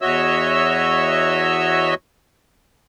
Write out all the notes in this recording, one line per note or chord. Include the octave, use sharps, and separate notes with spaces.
E2 F#4 C#5 D#5 E5 E6